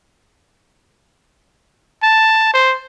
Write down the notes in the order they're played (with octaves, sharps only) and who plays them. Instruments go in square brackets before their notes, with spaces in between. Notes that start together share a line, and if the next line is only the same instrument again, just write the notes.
[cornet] A5
C5